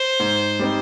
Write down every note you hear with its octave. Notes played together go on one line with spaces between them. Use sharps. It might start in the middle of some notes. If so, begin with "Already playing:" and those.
Already playing: C5
G#2
G3 C4 D#4